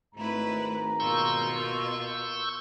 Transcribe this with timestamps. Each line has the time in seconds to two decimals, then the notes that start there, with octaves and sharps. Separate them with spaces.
0.15 G#1 G#2 A3 E4 B4 A#5
1.00 B2 A#3 F4 C#6 E6 G6